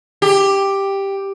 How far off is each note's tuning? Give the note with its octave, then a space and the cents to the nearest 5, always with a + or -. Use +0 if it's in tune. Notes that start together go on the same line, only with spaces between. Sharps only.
G4 +5